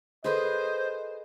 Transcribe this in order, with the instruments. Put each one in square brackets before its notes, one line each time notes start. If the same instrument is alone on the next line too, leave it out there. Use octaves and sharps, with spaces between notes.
[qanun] G#4 B4 [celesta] A4 B5 G6 [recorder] C5 [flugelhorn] D#5